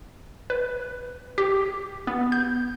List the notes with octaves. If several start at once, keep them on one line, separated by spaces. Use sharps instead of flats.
B4
G4
B3
G6